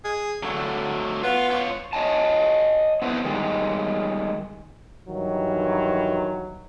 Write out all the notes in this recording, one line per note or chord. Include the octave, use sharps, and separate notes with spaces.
G#4
D3 F#3 A3
B3 F4
F4 C#5
C#5 D#5 F5 G#5 A5
B3 C4 D4 E4 B4 C5
D#3 G3 G#3
G2 D#3 E3 F#3